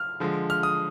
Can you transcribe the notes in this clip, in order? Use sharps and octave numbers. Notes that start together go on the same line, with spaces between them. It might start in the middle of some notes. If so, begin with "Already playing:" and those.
Already playing: F6
D3 F3 G#3
F6
D#6